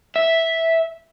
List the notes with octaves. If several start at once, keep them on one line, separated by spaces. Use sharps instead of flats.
E5